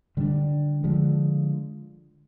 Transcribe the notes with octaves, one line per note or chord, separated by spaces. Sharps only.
D3 G3 A#3 D4
D3 F3 G#3